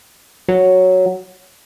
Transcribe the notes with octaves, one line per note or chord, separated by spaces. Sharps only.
F#3